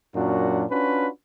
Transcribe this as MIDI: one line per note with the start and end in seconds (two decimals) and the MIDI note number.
0.15 0.64 42
0.15 0.64 46
0.15 0.64 54
0.15 0.64 62
0.15 0.64 66
0.70 1.07 61
0.70 1.07 62
0.70 1.07 65
0.70 1.07 66
0.70 1.07 71